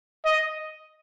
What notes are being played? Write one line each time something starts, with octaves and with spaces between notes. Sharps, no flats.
D#5